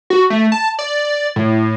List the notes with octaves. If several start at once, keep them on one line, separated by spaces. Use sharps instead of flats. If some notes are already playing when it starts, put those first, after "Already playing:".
F#4
A3
A5
D5
A2